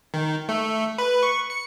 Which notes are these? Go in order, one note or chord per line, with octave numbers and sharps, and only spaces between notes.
D#3
A3
B4
C#6
C#7